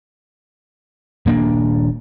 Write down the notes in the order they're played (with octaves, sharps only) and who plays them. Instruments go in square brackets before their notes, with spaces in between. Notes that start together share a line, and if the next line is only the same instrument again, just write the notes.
[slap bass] D#1 A#3 D4